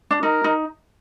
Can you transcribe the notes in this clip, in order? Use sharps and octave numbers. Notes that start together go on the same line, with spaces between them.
D4
D#4 A#4
D#4